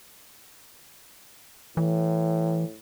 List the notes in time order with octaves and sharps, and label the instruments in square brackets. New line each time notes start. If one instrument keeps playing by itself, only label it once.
[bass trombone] A2 [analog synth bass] E3